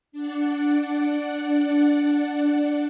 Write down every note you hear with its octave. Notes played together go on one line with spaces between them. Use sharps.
D4 D5 F#5